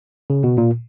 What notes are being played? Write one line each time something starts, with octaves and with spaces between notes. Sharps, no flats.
C#3
B2
A#2